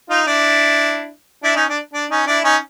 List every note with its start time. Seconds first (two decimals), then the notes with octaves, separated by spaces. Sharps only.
0.10 D#4 F4
0.27 D4 E4
1.43 D4 E4
1.56 C#4 D#4
1.69 D4
1.93 D4
2.10 C#4 D#4
2.27 D4 E4
2.44 C#4 D#4